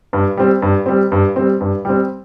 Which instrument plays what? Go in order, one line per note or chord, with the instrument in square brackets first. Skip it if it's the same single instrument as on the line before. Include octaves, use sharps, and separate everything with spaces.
[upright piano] G2
G3 C4
G2
G3 C4
G2
G3 C4
G2
G3 C4